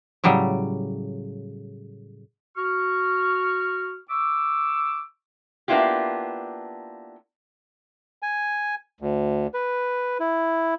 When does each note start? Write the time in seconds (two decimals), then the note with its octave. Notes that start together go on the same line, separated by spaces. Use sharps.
0.24 A2 C#3 F#3 G3
2.56 F#4 C#6 F6
4.10 C#6 D6 E6
5.68 A#3 B3 D4 E4 F4 G4
8.23 G#5
9.01 D2
9.54 B4
10.20 E4